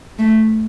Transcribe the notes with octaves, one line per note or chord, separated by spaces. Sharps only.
A3